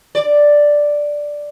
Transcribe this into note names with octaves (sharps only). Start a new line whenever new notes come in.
D5